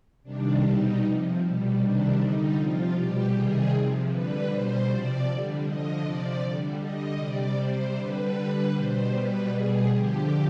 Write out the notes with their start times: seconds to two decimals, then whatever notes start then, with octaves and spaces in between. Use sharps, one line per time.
0.23 C3 D#3 G3 D4
0.61 B2 G3 D#4
1.00 C3 F3
1.39 B2 G3
1.77 C3 D#3 G3 D4
2.16 D3 G3 D#4
2.55 C3 F3 F4
2.92 B2 G3 G4
3.32 C3 D#3 G3 G#4
3.70 C3 F3
4.08 D3 G3 B4
4.47 B2 G3 C5
4.85 C3 F3 D5
5.24 D3 G3
5.62 D3 F3 D#5
6.01 C3 F3 D5
6.40 D3 G3
6.78 D3 G3 D#5
7.17 C3 G3 D5
7.55 C3 G3 C5
7.94 D3 G3 B4
8.32 D3 G3 B4
8.71 B2 G3 C5
9.09 B2 G3 B4
9.48 B2 G3 G#4
9.87 D3 F3 G4